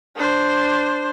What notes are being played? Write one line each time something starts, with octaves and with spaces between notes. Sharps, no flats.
D4 C5